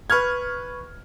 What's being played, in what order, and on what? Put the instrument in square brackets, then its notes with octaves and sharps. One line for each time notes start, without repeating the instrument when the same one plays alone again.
[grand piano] B4 C#6 F6 G#6